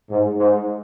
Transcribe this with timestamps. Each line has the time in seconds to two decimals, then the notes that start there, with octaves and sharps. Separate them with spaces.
0.10 G#2
0.38 G#2